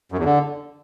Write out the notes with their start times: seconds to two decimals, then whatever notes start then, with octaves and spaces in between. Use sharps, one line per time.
0.12 F#2
0.18 E2
0.24 D3